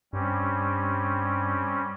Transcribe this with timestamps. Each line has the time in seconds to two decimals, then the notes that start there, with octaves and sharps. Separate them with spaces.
0.13 G2 G3 C4 C#4